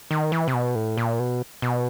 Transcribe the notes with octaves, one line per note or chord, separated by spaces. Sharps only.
D#3
E3
C3
B2
A2
A#2
B2
B2